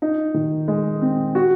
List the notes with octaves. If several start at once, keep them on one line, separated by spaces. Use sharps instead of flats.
D#4
D#3
G#3
C4
F#4